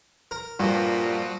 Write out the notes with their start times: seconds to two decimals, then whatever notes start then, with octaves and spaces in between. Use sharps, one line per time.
0.31 A#4
0.59 G2 A#2 F3 G3 F#4